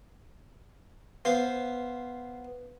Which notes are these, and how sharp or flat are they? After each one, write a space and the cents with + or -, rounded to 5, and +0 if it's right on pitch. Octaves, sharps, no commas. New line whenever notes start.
B3 +0 C5 +0 F5 -10